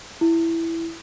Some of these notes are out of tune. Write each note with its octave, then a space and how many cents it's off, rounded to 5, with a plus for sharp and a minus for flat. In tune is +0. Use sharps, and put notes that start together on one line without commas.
E4 +5